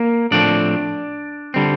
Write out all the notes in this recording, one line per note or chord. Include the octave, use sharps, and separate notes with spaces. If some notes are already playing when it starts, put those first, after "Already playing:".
Already playing: A#3
A2 F3 A3 C4 D4 D5
D3 G3 C4